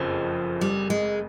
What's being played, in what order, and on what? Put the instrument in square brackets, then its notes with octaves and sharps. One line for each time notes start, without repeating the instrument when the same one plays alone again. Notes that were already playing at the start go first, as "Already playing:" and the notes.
Already playing: [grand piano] F#1 F2 C#3 [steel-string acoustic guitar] F3
[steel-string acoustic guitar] G3
G#3